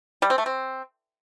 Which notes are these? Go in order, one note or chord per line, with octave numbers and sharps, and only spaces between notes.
G3
C4
A3
C4